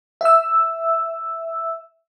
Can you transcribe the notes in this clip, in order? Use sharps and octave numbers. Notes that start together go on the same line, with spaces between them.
E5 E6